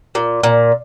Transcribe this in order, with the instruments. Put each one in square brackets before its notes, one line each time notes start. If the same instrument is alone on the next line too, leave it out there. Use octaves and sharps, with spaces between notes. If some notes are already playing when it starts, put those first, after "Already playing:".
[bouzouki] A#2
A#2